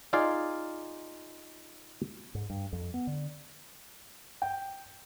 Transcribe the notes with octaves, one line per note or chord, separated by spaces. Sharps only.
D#4 F4 G#4 D5 F5
G#2
G2
F2
B3
D3
G5